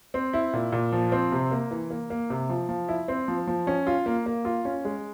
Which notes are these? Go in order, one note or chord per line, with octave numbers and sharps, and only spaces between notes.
C4
E4
A#2
A#2
F3
C4
C3
A#3
E3
A#3
A#3
C3
F3
F3
E4
C4
F3
F3
C#4
F4
A#3
A#3
F4
C#4
G#3